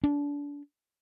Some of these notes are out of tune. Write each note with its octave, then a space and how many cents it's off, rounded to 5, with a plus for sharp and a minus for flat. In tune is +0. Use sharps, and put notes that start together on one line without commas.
D4 -30